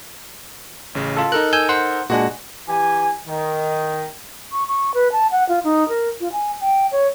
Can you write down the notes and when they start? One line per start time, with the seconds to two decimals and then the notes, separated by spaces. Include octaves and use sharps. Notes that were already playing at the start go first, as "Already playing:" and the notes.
0.95 A1 C#3
1.17 F4 A4
1.32 D#4 A4 A#4 F#6
1.53 G#5 E6 G6
1.69 C5 F#5
2.10 A#2 G#3 D4 F#4 F#5 G#5
2.69 E3 G4 G#5
3.28 D#3
4.52 C#6
4.68 C#6
4.94 B4
5.12 A5
5.32 F#5
5.49 F4
5.64 D#4
5.89 A#4
6.21 F4
6.32 G#5
6.61 G5
6.92 C#5